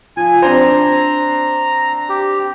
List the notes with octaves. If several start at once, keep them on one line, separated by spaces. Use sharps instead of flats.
F3 G#5
C4 D4 C5 A#5
G4